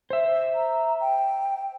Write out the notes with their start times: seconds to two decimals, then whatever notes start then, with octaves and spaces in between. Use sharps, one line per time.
0.10 C5 E5
0.55 A#5
1.01 G5